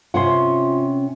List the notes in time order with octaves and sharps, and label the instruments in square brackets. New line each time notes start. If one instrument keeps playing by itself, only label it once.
[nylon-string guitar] C3 C#4 F#5 [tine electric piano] F4 C6